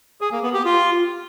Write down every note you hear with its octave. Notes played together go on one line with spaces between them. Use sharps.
G#4
A#3
B3
G4
F4